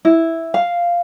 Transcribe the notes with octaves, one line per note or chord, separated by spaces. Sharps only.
E4
F5